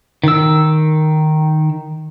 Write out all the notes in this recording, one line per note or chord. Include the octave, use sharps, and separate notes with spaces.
D#3 E6